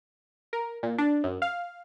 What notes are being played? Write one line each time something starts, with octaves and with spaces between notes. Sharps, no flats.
A#4
A#2
D4
F#2
F5